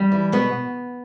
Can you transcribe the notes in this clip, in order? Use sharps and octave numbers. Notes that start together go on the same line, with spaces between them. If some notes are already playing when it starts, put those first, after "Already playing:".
Already playing: G3
E3
B2 B3